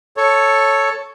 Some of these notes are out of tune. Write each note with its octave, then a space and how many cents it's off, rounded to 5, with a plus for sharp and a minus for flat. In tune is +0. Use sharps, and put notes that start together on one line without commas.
A4 +0 C#5 +0